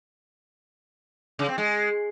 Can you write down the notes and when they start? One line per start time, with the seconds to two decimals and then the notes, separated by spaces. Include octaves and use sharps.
1.39 C#3
1.48 C4
1.58 G#3